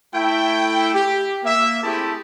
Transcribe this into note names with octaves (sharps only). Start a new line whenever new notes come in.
A3 E4 G5
G4
A#3 E5
A3 C4 E4 G4 G#4 A5